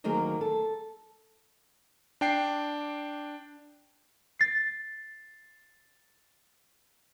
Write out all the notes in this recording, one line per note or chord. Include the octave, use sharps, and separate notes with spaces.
D2 D#3 F#3 A#3 G#4
A4
D4 G5 C7
A6 C7